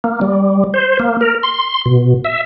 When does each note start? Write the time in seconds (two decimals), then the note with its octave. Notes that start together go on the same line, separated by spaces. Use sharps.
0.04 A#3
0.21 G3
0.74 C5
0.99 A#3
1.21 A#4
1.43 C6
1.86 B2
2.24 E5